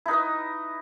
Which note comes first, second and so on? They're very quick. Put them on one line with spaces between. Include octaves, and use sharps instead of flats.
E4 D#4 B4 D#5